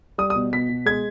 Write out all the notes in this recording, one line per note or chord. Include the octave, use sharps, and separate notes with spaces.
G3 D#6
D#6
B2
B2 B6
B2
G#3 G#6